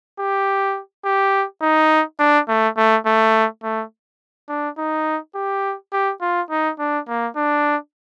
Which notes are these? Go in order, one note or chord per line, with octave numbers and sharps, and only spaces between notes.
G4
G4
D#4
D4
A3
A3
A3
A3
D4
D#4
G4
G4
F4
D#4
D4
A#3
D4